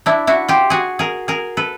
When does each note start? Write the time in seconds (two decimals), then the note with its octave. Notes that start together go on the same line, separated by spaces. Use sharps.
0.06 D4 E4
0.27 E4 F#4
0.48 F4 G4
0.70 F#4 G#4
0.99 G#4 A#4
1.28 G#4 A#4
1.57 A4 B4